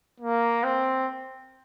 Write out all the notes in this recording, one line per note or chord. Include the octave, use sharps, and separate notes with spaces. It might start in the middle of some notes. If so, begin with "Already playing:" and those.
A#3
C4